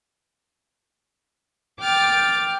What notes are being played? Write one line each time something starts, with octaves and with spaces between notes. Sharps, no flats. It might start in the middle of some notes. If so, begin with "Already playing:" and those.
G5 D6 F6 A6